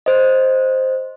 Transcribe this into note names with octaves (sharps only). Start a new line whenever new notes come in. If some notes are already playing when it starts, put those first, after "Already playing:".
C5 D#5